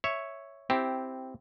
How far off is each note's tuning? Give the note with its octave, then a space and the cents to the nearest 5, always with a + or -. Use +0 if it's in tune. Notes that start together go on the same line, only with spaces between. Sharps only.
C#5 +0 E5 +0
C4 +0 E4 +0 G4 -10